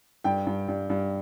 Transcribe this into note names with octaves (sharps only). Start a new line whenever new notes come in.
G2 G5
G2
G2
G2